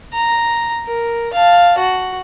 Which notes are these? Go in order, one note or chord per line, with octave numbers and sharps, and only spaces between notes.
A#5
A#4
F5 A5
F#4